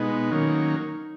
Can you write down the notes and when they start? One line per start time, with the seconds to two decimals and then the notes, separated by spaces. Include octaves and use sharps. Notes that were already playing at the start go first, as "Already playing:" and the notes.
Already playing: B2 G#3 B3 D#4
0.31 D#3 F#3 A#3 C#4